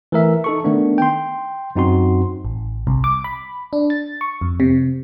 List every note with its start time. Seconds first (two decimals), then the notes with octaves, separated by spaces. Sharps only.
0.12 E3 A3 A#4 E5
0.44 D#4 A4 C#6
0.64 D#3 A3 B3 D4
0.98 G5 C6
1.76 F#2 C4 D#4 F#4 C6
2.45 A1
2.87 C2
3.04 D6
3.24 B5
3.73 D4
3.90 A6
4.21 C#6
4.41 F2
4.60 C3